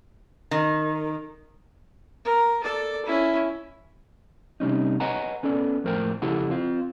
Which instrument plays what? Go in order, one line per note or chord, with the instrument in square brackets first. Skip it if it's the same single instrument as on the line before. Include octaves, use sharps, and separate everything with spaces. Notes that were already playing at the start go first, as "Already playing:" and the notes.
[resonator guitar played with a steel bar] D#3
[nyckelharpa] A#4
A4 D5
C#4 E4
[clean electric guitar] C3 G3 C#4 D#4
B4 C#5 D#5 F#5 G#5 A#5
B3 C#4 A4 D5
F2 A2 A#4 C5 G5
F2 C#3 E4 G4 A4 F#5
C4 F4